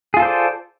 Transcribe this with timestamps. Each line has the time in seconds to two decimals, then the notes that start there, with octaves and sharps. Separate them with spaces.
0.14 G#4
0.17 F4
0.20 A4
0.22 C5
0.25 D5